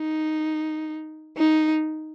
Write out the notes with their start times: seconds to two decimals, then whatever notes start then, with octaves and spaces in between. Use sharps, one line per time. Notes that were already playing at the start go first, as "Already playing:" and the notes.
Already playing: D#4
1.37 D#4